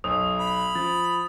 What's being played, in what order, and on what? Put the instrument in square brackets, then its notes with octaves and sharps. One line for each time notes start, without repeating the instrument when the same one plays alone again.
[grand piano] B1 [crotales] D#6
[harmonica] B5
[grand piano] F3 [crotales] A6